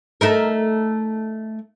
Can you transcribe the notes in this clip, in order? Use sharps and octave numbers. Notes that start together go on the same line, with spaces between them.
A3 D#4 A#4